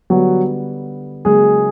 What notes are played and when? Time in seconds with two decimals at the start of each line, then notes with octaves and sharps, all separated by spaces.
0.10 D3 F#3 G3 B3 F#4
1.25 C#3 F#3 G#3 A#3 G#4